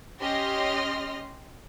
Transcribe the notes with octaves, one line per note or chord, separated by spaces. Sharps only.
C#4 G4 D#5 C6 F6 A#6